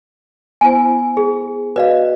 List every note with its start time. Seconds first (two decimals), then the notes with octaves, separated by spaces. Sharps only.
0.61 B3 E4 C5 G#5
1.17 G#4
1.76 F#4 B4 D5 D#5 F5